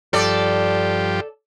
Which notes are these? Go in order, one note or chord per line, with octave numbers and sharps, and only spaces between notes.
G2 F3 G4 A4 D5